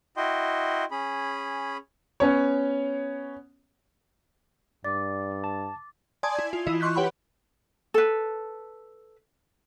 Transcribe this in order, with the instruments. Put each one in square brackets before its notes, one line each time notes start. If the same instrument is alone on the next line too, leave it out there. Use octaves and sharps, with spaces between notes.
[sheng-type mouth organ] E4 F#4 D#5 G5 C6
C#4 G#4 B5
[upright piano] B3 C#4 C#5
[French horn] G2 [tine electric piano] D5 [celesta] D6 A6
[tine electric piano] A5
[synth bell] D5 G#5 A5 C6 D#6 G#6
E4 G#6
F4
E3 E4 F4 D#5
C6 C#6 F#6 G6 B6
G4 B4 C#5 F#5 G5 B5
[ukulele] A4 B4